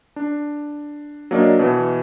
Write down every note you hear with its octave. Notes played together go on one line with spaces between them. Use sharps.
D4
F#3 A#3 D4 D5 D#5
B2 E3